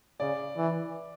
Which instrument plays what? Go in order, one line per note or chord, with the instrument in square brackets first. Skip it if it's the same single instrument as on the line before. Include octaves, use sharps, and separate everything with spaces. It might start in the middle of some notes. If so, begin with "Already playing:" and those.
[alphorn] C#3 [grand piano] D5
[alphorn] E3